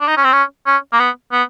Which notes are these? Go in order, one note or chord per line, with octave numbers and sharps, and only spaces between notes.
D4
D#4
C#4
C4
C#4
C#4
A#3
B3
B3